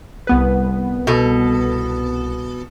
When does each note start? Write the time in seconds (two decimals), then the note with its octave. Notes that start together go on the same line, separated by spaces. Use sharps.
0.27 C2 B3 B4
1.07 B2 A4